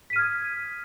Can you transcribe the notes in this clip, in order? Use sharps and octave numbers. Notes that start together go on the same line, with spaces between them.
D#6 F6 G#6 B6 D#7